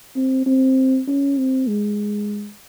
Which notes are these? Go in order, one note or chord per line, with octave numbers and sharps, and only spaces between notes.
C4
C4
C#4
C4
G#3